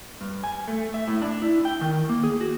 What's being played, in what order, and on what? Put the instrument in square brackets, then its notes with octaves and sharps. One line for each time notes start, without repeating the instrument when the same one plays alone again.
[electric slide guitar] G2
G#5
A3
E5
A2
D4
E4
G5
D#3
A#3
G#4
F#4